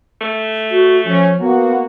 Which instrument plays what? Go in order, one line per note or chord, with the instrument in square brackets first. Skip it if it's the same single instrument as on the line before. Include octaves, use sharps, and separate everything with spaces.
[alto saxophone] A3
[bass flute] F#4
[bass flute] F3 [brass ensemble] C#4
[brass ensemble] A#3 F#4 [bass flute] B3